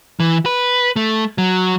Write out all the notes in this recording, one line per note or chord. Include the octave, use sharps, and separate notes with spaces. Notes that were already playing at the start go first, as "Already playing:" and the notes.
E3
B4
A3
F#3